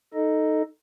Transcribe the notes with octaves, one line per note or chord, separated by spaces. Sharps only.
D#4 A4 D#5